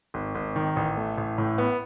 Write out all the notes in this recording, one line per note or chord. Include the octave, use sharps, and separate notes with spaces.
G#1
G#1
D#3
A1
A3
A1
A2
B3